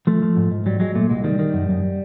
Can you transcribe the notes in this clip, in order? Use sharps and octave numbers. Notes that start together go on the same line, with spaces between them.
F3 A3
F3
G#2
G#2
F#3 G3
F#3 G#3
A#2 A3
C2 G#3
D#3 G3
D#3
F#2
F#2